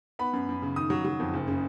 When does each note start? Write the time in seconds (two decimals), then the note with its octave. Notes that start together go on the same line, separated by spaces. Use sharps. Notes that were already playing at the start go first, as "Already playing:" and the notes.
0.19 B3 B5
0.33 F#2
0.49 F#2
0.62 C#3
0.76 D#3 D#6
0.90 F#3
1.05 F#3
1.19 F2
1.34 F#1
1.48 C#3